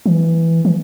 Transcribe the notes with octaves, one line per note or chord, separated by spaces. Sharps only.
E3
E3